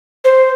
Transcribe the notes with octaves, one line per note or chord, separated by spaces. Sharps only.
C5